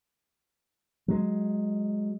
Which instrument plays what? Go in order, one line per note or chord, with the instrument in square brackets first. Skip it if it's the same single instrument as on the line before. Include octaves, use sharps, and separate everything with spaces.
[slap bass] F#3 G#3